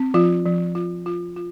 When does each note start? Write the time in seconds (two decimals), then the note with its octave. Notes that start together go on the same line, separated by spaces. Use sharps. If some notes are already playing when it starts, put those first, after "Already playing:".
Already playing: C4
0.14 F3 F4
0.45 F3
0.75 F4
1.06 F4
1.36 F4